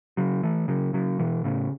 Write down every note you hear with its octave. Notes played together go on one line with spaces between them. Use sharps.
C#3 F#3
E3 A3
C#3 F#3
C#3 F#3
B2 E3
A2 C#3